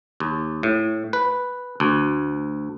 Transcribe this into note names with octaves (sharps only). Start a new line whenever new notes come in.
D#2
A2
B4
D2